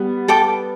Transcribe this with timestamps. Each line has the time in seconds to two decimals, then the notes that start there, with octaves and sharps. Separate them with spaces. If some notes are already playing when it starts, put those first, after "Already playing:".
Already playing: G3 B3
0.28 A4 G5 D6